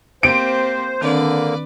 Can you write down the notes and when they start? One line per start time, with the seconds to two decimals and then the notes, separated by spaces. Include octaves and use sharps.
0.23 A#3 C4 G4 C5 D7
1.01 D3 D#3 A#3 C4 D4 B4 D5